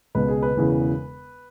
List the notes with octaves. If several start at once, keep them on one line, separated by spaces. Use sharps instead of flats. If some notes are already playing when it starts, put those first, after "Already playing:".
C#2 B2 B4
G#4
B4
E1 E2 C#3 E3